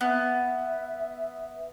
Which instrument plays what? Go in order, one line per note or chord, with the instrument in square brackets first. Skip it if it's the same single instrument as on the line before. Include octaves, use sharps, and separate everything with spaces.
[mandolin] B3 [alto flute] E5